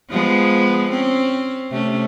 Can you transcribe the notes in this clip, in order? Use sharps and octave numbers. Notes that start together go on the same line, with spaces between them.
F3 G#3 B3
C4 C#4
C3 A3 C#4